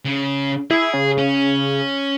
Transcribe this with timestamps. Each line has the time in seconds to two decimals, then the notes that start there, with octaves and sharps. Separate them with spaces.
0.05 C#3
0.71 E4 G#4
0.94 C#3
1.18 C#4